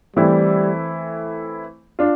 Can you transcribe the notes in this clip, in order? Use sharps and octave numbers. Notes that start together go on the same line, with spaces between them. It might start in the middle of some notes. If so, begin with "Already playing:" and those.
E3 G3 A3 C4 E4
D4 F4